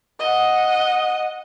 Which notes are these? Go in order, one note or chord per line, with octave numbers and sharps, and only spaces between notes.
D#5 F#5